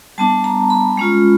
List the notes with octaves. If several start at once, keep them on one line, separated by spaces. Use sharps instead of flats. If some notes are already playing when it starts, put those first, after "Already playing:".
G3 B3 D4 A5
A#5
B5
G#3 C#4 F4